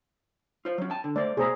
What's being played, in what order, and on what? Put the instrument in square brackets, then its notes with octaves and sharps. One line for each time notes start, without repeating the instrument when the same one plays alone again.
[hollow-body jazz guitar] F4 C5
F#3 C#4
G5 A5
D3
[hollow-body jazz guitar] A3 C5 [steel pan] D5
[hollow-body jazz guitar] B2 A3 B5 [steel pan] G#4 C5 A#5